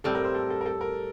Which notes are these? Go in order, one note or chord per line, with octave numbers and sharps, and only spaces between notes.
A2 G3 C4 A4
A#4
C5
A4
A4
A#4
A4
A#4